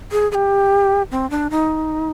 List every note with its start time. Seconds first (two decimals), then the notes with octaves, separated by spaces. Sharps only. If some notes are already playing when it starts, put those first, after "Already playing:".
0.12 G#4
0.31 G#4
0.35 G4
1.11 C4
1.30 D4
1.50 D#4